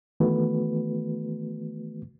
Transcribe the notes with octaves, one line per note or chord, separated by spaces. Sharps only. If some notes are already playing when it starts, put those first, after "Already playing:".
D#3 E3 A3 B3 F#4 B4